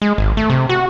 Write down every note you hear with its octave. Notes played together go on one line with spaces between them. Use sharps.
G#3
G#1
A3
C3
F#4